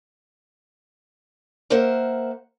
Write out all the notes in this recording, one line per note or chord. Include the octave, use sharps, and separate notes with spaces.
A#3 A#4 C5 E5 F#5